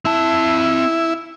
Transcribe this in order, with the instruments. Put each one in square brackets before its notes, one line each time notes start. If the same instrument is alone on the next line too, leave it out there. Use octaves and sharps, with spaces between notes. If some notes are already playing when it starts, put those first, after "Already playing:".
[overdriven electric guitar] C4 A5 [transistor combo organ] E4